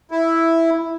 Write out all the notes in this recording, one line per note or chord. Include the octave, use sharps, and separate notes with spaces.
E4